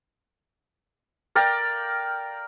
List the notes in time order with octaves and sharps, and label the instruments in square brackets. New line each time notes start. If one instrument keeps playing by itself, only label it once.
[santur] A#4 D5 F5 G5